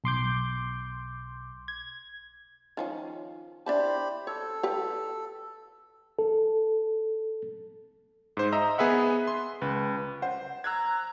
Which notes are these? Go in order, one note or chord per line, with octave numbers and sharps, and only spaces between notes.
B1 C6 D6 G6
G#6
D#3 F3 C#4
D4 E4 G4 C5 A5 B5
A4 C#5
G4 B4
A4
G#2 C5
D#5 E5 A#5 E6
B3 G#4 B4 E5 F#5
C6
C#2 B4
C5 F#5
A#5 E6 F#6 G#6